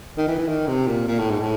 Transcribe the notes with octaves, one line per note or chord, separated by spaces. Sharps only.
D#3
E3
E3
D#3
C3
A#2
A#2
A2
G#2
A2